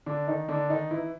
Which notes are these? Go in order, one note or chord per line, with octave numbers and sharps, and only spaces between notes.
D3 D4
D#3 D#4
D3 D4
D#3 D#4
E3 E4